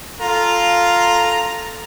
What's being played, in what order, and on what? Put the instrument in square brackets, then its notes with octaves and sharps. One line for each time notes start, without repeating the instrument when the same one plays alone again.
[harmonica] F4 A#5 [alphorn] A4